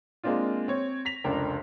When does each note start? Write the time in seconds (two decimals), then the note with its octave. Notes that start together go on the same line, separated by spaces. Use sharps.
0.24 G#3 A#3 C4 D4 F4
0.68 C4 C#5
1.05 A#6 B6 F7
1.24 F1 C#2 D4 A#4 G5